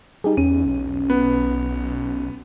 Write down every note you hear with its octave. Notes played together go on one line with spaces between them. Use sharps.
G3 D#4 G4 G#4
E2 C#4 D#7
B1
B3